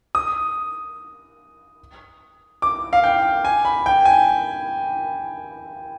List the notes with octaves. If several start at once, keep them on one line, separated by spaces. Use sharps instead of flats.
D#6
D6
F5
G5
G#5
B5
G5
G#5